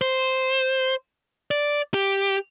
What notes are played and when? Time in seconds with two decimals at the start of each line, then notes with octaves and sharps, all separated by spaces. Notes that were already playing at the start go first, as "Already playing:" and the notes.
0.01 C5
1.51 D5
1.94 G4